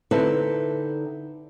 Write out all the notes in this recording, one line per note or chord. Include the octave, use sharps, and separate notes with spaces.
D3 C4 D#4 E4 A4 B4